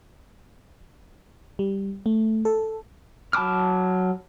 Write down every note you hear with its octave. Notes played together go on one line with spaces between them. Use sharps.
G3
A3
A4
F#3 A5 B5 D6 F6